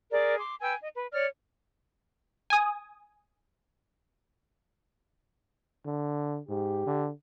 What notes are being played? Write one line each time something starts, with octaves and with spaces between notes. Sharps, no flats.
G#4 A#4 D5
C6 D6
B4 G5 G#5 E6
D#5
B4
C#5 D5 F6
G#5 D#6
D3
G#2 G4
D3